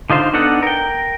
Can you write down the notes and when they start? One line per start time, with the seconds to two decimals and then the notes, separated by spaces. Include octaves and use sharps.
0.10 D3 D#4 F4 C5
0.33 B3 D4 D#4 A4 F#5
0.63 A#4 G5